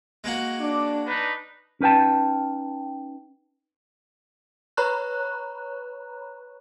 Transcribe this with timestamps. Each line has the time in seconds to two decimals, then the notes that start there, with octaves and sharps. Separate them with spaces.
0.24 G#3 A#3 F#4
0.60 D4 D6
1.06 D4 D#4 B4
1.81 C#4 D#4 B4 G5 A5
4.77 B4 C#5 A#5 B5 C#6 F#6